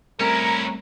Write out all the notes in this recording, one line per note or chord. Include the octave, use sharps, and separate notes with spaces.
G3 A3 C4 C#4 E4 A#4 A#5